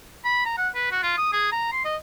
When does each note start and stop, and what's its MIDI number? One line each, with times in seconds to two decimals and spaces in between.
0.25 0.42 83
0.45 0.57 82
0.57 0.68 78
0.75 0.88 71
0.91 1.02 66
1.03 1.14 65
1.18 1.29 87
1.32 1.50 68
1.52 1.69 82
1.72 1.80 84
1.85 1.96 75